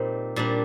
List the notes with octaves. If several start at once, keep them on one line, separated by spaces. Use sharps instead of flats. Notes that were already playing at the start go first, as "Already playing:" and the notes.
Already playing: A#2 G3 C4 D#4
A#2 G3 D4